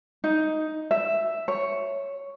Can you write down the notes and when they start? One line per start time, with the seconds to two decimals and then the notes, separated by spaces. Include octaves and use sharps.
0.24 D#4
0.91 E5
1.48 C#5